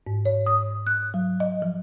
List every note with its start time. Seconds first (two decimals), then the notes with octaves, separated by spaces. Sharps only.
0.07 G#2
0.25 C#5
0.46 D#6
0.87 F#6
1.14 F#3
1.40 D#5
1.62 F3